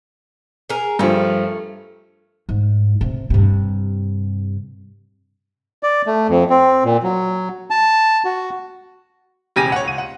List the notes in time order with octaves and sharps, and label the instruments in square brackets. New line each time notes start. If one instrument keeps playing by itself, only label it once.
[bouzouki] G#4 A#4
[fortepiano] G2 F3 [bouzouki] A3 A#3
[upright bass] G#2
C3
G2 C3
[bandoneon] D5
A3
F2
C4
A#2
F#3
A5
F#4
[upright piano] E1 C#3 G4 G#5 A#6 D#7
C#5 F#5
C#2 D#7
F#5